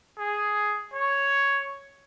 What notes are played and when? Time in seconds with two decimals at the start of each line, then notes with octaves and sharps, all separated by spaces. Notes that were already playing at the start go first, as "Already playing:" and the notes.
0.18 G#4
0.93 C#5